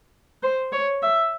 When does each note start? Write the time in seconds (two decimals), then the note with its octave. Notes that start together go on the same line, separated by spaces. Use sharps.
0.43 C5
0.72 C#5
1.03 E5